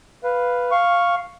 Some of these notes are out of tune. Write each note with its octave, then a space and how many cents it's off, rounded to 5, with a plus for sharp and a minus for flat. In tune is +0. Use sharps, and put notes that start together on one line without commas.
B4 +0 F5 +0
F5 +0 C#6 +0